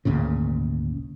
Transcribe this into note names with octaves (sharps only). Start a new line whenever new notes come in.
G#1 D2 A#2 C#3